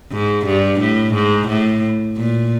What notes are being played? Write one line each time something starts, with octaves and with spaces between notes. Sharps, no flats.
G#2
G2
A2
G#2
A2
A#2